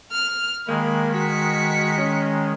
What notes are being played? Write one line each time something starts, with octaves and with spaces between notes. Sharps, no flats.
F6
D#3 G#3 A#3 B5
F#4 B6 C#7
C#4